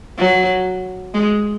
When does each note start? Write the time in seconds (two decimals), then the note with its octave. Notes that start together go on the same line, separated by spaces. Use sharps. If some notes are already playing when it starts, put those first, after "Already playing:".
0.18 F#3
1.14 G#3